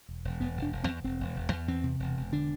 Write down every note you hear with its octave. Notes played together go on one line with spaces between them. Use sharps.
E1
E1
E1 B3
E1
D4
E1
C4
E2
E1 C4
E1
E1
E2
E2 C4
C3
E1
E1
D3 D4